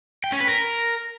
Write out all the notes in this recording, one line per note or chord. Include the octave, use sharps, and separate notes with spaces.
G5
C#4
B4
A#4